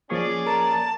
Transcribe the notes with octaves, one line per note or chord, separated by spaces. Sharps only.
F3 A#3 C#4 G#4 D5 C#6
A#4 A5